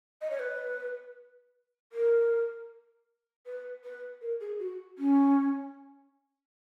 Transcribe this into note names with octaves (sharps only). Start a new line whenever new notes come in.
D#5
C#5
B4
A#4
B4
B4
A#4
G#4
F#4
C#4